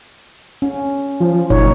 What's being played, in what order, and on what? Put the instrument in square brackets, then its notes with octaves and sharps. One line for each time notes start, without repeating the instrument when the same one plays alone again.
[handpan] C#4
[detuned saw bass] F3
[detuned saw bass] F#1 [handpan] A#2 D#4 C#5